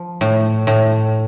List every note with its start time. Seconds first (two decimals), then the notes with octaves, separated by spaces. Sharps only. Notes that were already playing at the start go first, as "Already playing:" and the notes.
Already playing: F3
0.21 A2
0.67 A2